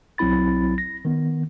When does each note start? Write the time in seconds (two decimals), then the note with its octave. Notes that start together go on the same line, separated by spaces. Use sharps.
0.18 B1 F#3 C4 E4 B5 A6
0.78 A#6
1.05 D#3 B3